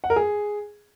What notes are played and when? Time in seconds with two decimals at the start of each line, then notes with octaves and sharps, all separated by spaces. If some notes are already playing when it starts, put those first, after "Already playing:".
0.04 F#5
0.10 A#4
0.16 G#4